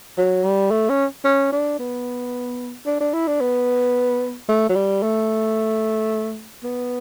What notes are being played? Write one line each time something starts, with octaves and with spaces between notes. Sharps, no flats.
F#3
G3
A3
C#4
C#4
D4
B3
D4
D4
E4
D4
B3
A3
F#3
G3
A3
B3